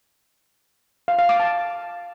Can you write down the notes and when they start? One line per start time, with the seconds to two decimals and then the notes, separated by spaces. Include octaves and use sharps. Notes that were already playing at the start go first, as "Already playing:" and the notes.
1.08 F5
1.19 F5
1.29 D6
1.40 A5